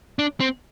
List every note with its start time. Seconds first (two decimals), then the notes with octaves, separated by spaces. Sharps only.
0.19 D4
0.40 C4